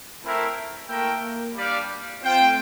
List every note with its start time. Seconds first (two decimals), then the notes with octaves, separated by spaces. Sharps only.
0.22 A3 C4 E4 A#4
0.88 A3 A#3 E4 A#4 E5 G5
1.55 G3 D4 G4 D5 F5
2.23 C4 F4 C5 G5
2.40 A3